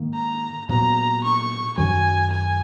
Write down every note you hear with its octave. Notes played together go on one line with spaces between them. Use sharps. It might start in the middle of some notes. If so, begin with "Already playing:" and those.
Already playing: G#2 D#3 A#3
A#5
A#2 F#3 B3 A#5
C#6
F#2 D#3 F#3 G#5
G#5